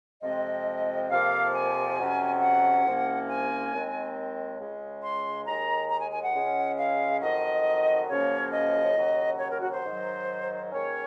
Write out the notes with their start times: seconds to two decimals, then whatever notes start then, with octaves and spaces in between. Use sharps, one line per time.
0.23 F2 C3 F3 G#3 C4 D#5
1.10 F2 C3 F3 A#3 F5
1.54 G#5
1.97 F2 C3 F#3 C#4
2.41 F#5
2.84 C2 C3 F3 A#3 C#4
3.29 G#5
3.72 D#2 D#3 G#3 C4
4.60 C#2 C#3 G#3
5.03 C6
5.47 D#2 D#3 G#3 A#5
5.90 A#5
6.02 G#5
6.13 G#5
6.24 F#5
6.34 C#2 C#3 G#3 C#4
6.78 F5
7.21 F2 D#3 F#3 D#5
8.09 F#2 C#3 F3 A#3 C#4 C#5
8.53 D#5
8.96 D#2 C#3 F#3
9.40 C#5
9.52 A#4
9.62 F#4
9.73 C5
9.84 G#2 D#3 F#3
10.71 G#2 D#3 A#3 C#4 C#5